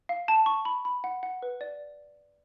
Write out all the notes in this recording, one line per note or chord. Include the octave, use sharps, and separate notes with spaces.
F5
A5
C#6
B5
B5
F#5
F#5
B4
D5